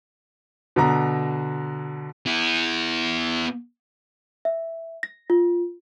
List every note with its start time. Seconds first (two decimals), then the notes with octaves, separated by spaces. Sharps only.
0.76 B2 D3 A#5
2.26 B3 E4
4.45 E5
5.03 A#6
5.30 F4